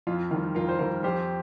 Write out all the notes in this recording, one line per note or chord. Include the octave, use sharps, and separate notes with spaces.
F2 F4
D#3 G3 F4
F2 F4 A#4
C5
D#3 G3 F4 A#4
F2 G4 C5